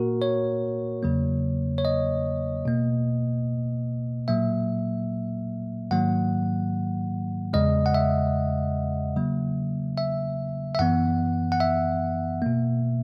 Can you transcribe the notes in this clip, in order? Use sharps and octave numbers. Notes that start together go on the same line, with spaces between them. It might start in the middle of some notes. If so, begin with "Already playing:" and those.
Already playing: A#2 A#3 F#4 A#4
C#5
E2 C#3 F#3 A#3
C#5
D#5
B2 A#3
A#2 F#3 A#3 E5
G#2 D#3 F#3 A#3 F#5
E2 C#3 G#3 D#5
F#5
E5
C#3 F#3 A#3
E5
E5
F#2 E3 B3 F#5
F#5
E5
B2 A#3